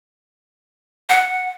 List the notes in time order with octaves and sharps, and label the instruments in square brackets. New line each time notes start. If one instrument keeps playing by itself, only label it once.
[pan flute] F#5